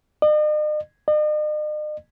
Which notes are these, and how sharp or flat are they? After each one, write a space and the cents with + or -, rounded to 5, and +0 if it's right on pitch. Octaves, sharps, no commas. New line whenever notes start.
D#5 -45
D#5 -45